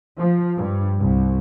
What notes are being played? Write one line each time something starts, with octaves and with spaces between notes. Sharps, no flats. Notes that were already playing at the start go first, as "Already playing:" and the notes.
F3
G2
C2